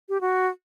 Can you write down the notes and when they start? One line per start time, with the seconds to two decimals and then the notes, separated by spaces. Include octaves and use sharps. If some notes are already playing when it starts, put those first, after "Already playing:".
0.09 G4
0.21 F#4